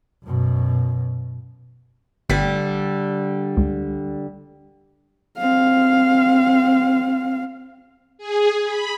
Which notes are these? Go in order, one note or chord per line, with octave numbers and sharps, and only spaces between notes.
F#2 B2
G1 D3 G3 B6
C#2
C4 F5
G#4
B5